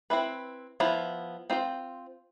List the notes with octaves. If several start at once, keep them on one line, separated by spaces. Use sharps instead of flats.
C4 E4 B4
F3 B3 E4
C4 F4 C5